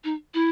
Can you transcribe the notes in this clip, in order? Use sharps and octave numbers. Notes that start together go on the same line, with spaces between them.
D#4
E4